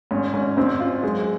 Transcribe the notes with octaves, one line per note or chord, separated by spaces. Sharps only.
G#1 G#2 C#4
G#1 G#2 C#4
G#1 G#2 C4
F4
F#2 G#3